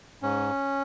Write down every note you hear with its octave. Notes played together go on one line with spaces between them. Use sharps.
G#2 C#4